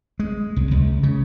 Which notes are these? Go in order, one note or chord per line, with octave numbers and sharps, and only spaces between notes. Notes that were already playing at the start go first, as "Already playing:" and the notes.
G#3
C2
C#2
C#3